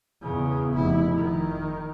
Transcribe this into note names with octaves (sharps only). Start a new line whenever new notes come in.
E2 C#3
F1 E4
D#3